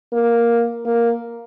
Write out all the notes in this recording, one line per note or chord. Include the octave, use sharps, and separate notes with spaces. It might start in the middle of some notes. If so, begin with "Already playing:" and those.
A#3
A#3